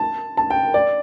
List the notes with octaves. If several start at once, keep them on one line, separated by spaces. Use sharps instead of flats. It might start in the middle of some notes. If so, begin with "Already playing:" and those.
Already playing: A5
A5
G5
D5